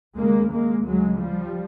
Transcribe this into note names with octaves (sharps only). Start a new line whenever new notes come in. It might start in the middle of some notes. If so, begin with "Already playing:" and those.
D#2 C#3 G#3 A#3
G#3 A#3
D2 C#3 F#3 G#3
F3 G3